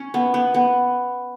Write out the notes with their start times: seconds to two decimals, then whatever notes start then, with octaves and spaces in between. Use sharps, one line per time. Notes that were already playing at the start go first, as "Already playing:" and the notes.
Already playing: C#4
0.14 B3
0.34 B3
0.54 B3